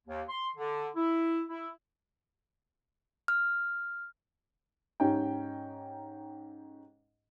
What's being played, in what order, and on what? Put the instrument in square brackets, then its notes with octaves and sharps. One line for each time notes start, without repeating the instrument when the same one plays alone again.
[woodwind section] D#2
C6
D3
E4
E4
[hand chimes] F6
[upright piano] G#2 C#4 D#4 G4 G5